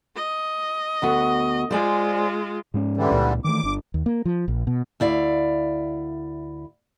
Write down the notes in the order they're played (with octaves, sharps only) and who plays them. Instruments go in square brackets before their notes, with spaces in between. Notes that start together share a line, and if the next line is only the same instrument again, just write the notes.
[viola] D#5
[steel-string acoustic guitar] D2 B3 F#4
[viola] G#3 F4 [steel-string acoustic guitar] C5 D5 G#5
[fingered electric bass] G#2 G#3 C#4
[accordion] D3 E3 G3
[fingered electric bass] C#2 A#2
[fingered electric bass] D#3 E3 A3 [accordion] D6
[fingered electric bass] G1 D4
[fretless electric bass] D#2
A#3
F3
A#1
B2
[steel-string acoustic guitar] D2 E4 D5 F5